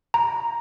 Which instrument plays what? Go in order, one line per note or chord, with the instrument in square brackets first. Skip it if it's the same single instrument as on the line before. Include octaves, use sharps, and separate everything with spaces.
[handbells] A#5